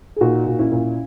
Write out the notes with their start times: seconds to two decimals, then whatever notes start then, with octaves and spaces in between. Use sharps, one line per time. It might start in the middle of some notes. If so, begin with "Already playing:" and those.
0.16 G#4
0.21 A#2 D#4 F#4
0.46 A#2
0.59 C#4 E4
0.72 A#2